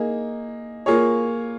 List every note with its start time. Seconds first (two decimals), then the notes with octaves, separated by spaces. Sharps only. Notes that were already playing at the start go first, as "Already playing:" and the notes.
Already playing: A#3 D#4 G#4
0.86 A#3 F4 G#4 C#5